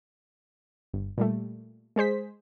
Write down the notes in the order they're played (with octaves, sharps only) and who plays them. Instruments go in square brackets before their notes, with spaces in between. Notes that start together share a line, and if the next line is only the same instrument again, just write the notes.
[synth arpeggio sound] G1
A#2 G3 A3
G#3 G#4 C5 B6